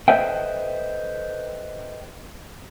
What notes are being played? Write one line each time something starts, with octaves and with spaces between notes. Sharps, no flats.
A4 B4 C5 D#5 E5 G5